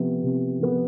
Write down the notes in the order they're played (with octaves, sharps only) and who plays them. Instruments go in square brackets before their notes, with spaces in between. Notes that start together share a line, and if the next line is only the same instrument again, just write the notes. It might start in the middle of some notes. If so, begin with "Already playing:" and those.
Already playing: [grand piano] C3 F3 B3
C3
F3 B3